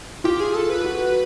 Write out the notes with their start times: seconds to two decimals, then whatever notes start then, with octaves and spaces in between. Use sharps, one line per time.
0.24 F4 G4
0.40 G#4
0.55 A4
0.70 B4
0.84 F#4